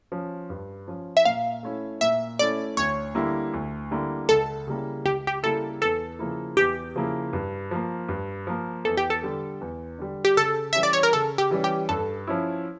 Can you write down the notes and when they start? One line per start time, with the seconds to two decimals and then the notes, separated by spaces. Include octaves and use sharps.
0.12 F3 C#4
0.50 G2
0.87 F3 C#4
1.17 E5
1.25 A#2 F5
1.63 A3 C#4 E4
2.01 A#2 E5
2.39 A3 C#4 E4 D5
2.77 D2 C#5
3.15 D3 G3 A#3 E4
3.54 D2
3.91 D3 G3 A#3 E4
4.29 C#2 A4
4.67 C#3 G3 A#3 E4
5.05 C#2 G4
5.27 G4
5.43 C#3 G3 A#3 E4 A4
5.81 E2 A4
6.19 C#3 F3 A#3 E4
6.57 E2 G4
6.96 C#3 F3 A#3 E4
7.33 G2
7.71 F3 A#3
8.09 G2
8.47 F3 A#3
8.85 E2 A4
8.97 G4
9.10 A4
9.23 D3 G3
9.61 E2
9.98 D3 G3
10.25 G4
10.37 C#3 A4
10.73 E3 G3 C#4 E5
10.83 D5
10.93 C#5
11.03 A#4
11.13 C#3 A4
11.38 G4
11.51 E3 G3 C#4
11.64 G4
11.89 G2 A4
12.27 F3 C#4 E4